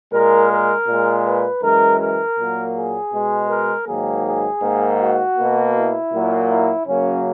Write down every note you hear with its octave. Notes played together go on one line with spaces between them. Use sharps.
A#2 G#3 A#4
A#4
A#2 G#3
B4
F#2 E3 G#3 A#4
A#4
A#2 F#3 A#3
G#4
B2 G#3
A#4
G#2 D#3 F#3 A#3 G#4
G#4
G#2 D#3 A#3
F#4
B2 A#3
E4
A#2 F#3 A#3
E4
F#2 C#3 F#3 A#3 C#4